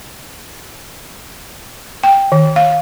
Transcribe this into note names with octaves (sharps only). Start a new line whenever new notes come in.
G5
D#3
F5